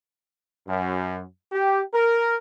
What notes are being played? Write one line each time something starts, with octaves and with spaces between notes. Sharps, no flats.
F#2
G4
A#4